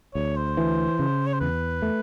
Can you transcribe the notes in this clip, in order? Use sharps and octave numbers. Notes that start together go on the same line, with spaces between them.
D2 C#5
C5
E3
C#3
C#5
C5
E2 B4
A3